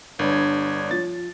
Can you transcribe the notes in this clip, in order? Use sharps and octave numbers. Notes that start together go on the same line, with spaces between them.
G1 G3 D4 B4 C#5
F3 A6